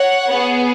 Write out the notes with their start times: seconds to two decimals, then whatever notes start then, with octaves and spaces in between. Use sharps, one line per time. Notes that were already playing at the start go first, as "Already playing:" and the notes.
Already playing: C#5 F#5
0.28 B3 G#4